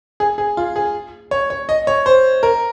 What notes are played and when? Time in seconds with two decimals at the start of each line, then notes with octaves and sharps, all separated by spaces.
0.20 G#4
0.38 G#4
0.57 F4
0.76 G#4
1.31 C#5
1.50 C#5
1.69 D#5
1.87 C#5
2.06 C5
2.43 A#4